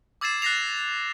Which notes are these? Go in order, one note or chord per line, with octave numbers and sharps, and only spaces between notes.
D6 E6 G#6 A6 C7 E7
F#6 A6 A#6 C7 F7